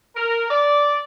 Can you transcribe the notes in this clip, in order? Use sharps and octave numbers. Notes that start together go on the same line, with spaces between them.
A#4
D5